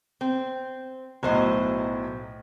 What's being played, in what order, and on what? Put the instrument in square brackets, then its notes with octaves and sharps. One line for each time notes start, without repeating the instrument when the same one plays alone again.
[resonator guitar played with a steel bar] C4
[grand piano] B1 A2 [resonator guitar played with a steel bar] F#3 C5 D#5